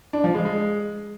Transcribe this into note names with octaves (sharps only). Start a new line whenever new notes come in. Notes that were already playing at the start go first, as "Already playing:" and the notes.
D4
F3
G#3
G#3